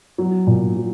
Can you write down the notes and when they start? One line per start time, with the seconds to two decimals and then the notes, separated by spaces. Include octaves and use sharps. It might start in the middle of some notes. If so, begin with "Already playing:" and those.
0.18 F#3
0.47 A#2
0.77 F#3